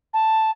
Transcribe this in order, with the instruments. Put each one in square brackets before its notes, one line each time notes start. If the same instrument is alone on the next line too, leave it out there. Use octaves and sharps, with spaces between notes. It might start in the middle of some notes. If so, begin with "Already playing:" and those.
[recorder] A5